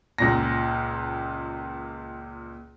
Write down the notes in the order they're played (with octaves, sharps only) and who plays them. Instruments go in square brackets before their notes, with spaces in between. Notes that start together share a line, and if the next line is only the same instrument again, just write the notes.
[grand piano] C#2 A#2 A#6